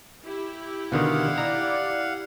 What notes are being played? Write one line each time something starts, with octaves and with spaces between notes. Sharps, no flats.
E4 G4
B2 D3 D#3 F5 F#5
D5 A#5